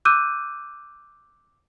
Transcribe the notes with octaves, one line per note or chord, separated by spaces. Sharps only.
D6 E6 F#6 G6 D#7